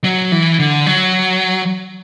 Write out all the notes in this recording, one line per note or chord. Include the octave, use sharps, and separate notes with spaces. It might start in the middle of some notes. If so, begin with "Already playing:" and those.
F#3
E3
D3
F#3